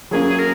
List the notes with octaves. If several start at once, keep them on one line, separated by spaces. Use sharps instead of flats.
F#3 A#3 C#4 G#4
A#4